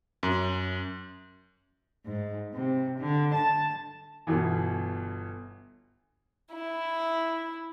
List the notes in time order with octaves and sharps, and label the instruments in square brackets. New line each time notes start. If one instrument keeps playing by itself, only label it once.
[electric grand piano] F#2
[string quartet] G#2
C3
D3
A5
[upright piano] G1 B2 E3
[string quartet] E4